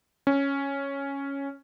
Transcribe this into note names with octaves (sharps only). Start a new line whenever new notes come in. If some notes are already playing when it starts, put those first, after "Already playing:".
C#4